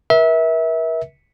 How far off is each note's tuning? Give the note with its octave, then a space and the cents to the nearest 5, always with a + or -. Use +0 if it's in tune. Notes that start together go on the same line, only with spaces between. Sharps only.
A#4 +45 E5 -25